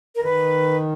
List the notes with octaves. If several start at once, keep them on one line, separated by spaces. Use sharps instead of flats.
A#4
D#3 B4